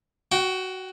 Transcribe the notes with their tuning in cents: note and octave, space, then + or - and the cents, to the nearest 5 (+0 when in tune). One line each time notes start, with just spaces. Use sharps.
F#4 +10 G5 -20